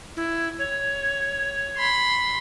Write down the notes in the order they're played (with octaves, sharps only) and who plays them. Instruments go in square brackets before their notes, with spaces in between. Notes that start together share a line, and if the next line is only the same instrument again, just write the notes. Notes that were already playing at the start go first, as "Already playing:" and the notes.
[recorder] E4
C#5
[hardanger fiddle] B5 C6